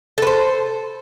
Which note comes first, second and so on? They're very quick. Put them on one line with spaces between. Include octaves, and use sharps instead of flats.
A4 B4 C5